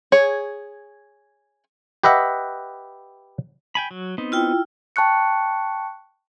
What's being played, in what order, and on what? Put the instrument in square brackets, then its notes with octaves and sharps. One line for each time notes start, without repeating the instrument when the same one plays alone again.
[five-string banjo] G#4 C#5
[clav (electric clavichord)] G4 B4 D#5 E5 F#5
[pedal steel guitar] G5 G#5 B5
F#3
B3 C4 D#4
[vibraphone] E4 F4 G5
[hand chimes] G5 A5 C#6 F#6 C#7